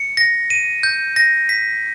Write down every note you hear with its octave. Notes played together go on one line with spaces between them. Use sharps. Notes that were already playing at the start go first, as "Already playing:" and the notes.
Already playing: C#7
A#6
D#7
G6
A#6
B6